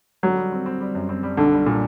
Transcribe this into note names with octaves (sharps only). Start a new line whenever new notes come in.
D3 F#3
G3
C4
C4
G3
F#2
C4
G3
B1 D3
G3
A#2